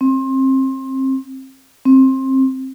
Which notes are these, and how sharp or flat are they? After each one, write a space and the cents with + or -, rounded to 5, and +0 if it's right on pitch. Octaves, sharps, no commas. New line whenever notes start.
C4 +25
C4 +20